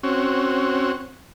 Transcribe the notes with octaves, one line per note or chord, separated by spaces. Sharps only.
C4 C#4 F#4